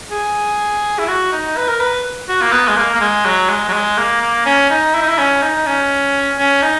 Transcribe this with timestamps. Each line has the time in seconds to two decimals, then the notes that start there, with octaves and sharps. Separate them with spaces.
0.11 G#4
0.99 E4
1.08 F#4
1.32 D#4
1.57 B4
1.69 A#4
1.81 B4
2.29 F#4
2.42 A#3
2.52 B3
2.68 G#3
2.77 A#3
2.94 A#3
3.01 G#3
3.26 F#3
3.49 G#3
3.68 F#3
3.73 G#3
3.98 A#3
4.21 A#3
4.46 C#4
4.70 D#4
4.95 E4
5.02 D#4
5.09 E4
5.18 C#4
5.42 D#4
5.66 C#4
6.39 C#4
6.62 D#4